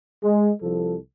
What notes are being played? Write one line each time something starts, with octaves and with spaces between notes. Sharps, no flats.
G#3
C2 F3 A4